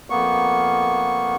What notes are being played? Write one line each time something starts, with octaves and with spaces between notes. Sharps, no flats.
F2 A#3 B3 C#6